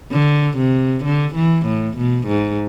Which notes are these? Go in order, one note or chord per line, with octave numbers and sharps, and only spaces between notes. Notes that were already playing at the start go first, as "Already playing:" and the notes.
D3
C3
D3
E3
A2
B2
G#2